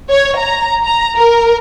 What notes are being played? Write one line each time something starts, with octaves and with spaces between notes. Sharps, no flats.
C#5
A#5
A#5
A#4